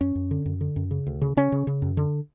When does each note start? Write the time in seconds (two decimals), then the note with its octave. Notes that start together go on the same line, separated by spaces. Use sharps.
0.01 F#2 C#4
0.15 F#2
0.31 D3
0.46 F#2
0.61 D3
0.76 F#2
0.91 C#3
1.07 D2
1.22 C#3
1.37 C#3 C#4
1.52 C#3
1.67 C#3
1.82 F#2
1.97 D3